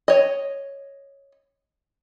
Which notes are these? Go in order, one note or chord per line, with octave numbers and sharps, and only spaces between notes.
C#5 D#5